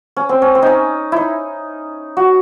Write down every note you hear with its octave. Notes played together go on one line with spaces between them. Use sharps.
C#4
C4
C#4
C4
C#4 D#4
D#4 E4
F#4